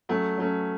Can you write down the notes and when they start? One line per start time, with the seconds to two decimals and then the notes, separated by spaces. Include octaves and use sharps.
0.09 F#3 A3 C#4
0.38 F#3 A3 C#4